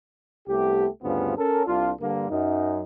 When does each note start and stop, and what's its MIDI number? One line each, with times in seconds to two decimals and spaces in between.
0.48 0.87 36
0.48 0.87 57
0.48 0.87 59
0.48 0.87 67
1.03 1.35 38
1.03 1.35 43
1.03 1.35 49
1.03 1.35 59
1.03 1.35 60
1.03 1.35 65
1.38 1.63 61
1.38 1.63 69
1.38 1.63 70
1.66 1.92 36
1.66 1.92 62
1.66 1.92 65
2.00 2.27 43
2.00 2.27 50
2.00 2.27 58
2.30 2.83 42
2.30 2.83 63